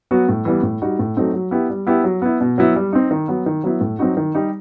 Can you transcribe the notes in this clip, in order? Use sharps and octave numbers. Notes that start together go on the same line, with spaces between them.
F#3 B3 F#4
A2
E3 G3 B3
A2
G3 D#4 F#4
A2
F#3 A3 C4 D#4
F#3
B3 E4 G4
G3
B3 E4 G4
F#3
B3 E4
B2
F#3 B3 E4
G3
C4 D#4
D#3
F#3 B3
D#3
F#3 B3 E4
A2
F#3 C4 D#4 F#4
D#3
G3 D#4 G4